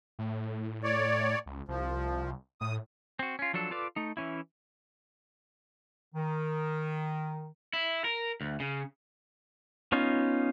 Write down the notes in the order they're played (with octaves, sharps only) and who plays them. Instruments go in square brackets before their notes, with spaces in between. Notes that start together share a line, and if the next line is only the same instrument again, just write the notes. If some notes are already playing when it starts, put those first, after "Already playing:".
[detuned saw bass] A2
[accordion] C#5 D5
[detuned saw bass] C#2
[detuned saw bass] C2 [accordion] F3
[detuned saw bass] A2 [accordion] D#6
[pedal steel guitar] C4 F#4
C#4 F4
F3 F#3 D4 A4
F4 A4 B4 D5 D6
A3 D#4
E3 C#4 E4
[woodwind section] D#3
[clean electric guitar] E4
A#4
D2
C#3
[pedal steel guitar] B3 C#4 D#4 F4